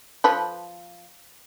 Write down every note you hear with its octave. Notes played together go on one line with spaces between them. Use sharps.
F3 A4 B4